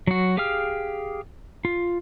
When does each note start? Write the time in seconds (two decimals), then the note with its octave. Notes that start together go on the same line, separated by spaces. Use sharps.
0.07 F#3 F#4
0.37 G4 G#4 F5 G5 F6
1.65 F4